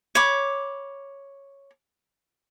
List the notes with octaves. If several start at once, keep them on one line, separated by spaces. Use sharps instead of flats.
C#5 B5 D6